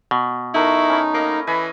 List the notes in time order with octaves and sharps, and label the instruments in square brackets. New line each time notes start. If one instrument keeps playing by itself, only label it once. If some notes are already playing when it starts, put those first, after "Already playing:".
[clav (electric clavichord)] B2
[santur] A3 A#4 [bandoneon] D#4 [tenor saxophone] E4
[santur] C#4 B5
[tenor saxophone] A#3 [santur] D#5
[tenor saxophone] E3 [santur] D#5 G#5 B5